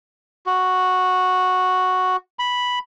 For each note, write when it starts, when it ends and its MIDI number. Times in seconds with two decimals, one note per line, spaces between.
0.46 2.16 66
2.39 2.79 83